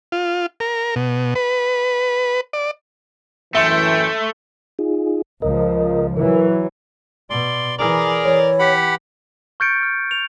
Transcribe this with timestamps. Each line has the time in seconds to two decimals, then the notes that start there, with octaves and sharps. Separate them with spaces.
0.12 F4
0.60 A#4
0.96 B2
1.35 B4
2.53 D5
3.55 F#2 A2 E3 A3 E5 G5 C6
4.79 D#4 F4 G#4
5.42 C#2 F3 A#4 D#5
6.17 E3 F#3 A#4
7.30 B2 D5 C6
7.79 E3 G#4 A#4 D5
8.24 E3 C#5
8.59 G4 F#5 B5
9.60 C#6 F6 G6 A6 C#7 D7
9.83 F6
10.11 F7